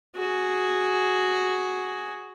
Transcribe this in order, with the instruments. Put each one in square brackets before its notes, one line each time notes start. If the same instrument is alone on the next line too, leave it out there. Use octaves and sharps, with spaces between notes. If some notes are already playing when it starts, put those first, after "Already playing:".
[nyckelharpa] F#4 G#4